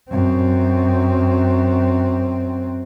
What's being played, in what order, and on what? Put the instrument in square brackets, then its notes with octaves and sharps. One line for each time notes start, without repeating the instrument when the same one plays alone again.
[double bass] F#2 C4